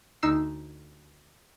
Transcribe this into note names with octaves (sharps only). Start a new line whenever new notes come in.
D2 D#4 E6 C7